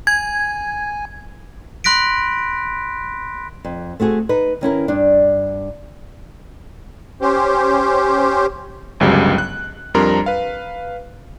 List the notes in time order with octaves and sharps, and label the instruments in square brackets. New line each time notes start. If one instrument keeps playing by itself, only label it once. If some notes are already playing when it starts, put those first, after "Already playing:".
[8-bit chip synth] G#5 [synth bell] G#6
[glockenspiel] B5 C6 F#6 A#6 B6 D7
[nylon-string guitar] F2
A3 C4 F#4 G#4
D#4 B4
D#3 C#4 E4 A#4
G2 D4
[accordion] C#4 G4 C5
[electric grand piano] G1 C#2 C#3 F#3 G3 G4
F#6
F2 G3 D4 A#4 A#5 C6
B4 F5